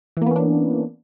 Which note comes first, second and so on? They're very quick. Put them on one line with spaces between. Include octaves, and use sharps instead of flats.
E3 A#3 B3 C#4 D4